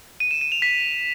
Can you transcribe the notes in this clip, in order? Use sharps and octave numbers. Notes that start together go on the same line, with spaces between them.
D#7
E7
D#7
F7
B6